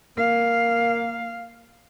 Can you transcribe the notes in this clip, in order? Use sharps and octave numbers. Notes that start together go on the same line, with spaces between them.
A#3 F5